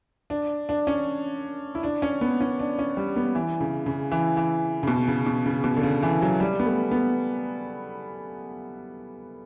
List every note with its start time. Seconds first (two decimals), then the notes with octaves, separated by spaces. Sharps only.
0.30 D4
0.69 D4
0.87 C#4
1.75 E4
1.83 D4
2.02 C#4
2.21 B3
2.41 C#4
2.59 D4
2.79 C#4
2.97 G3
3.16 B3
3.35 E3
3.60 C#3
3.86 C#3
4.11 E3
4.37 E3
4.83 C#3
4.87 B2
5.08 C#3
5.26 B2
5.46 C#3
5.64 B2
5.76 D3
5.83 C#3
6.03 E3
6.22 F#3
6.40 G3
6.60 B3
6.66 A3
6.91 B3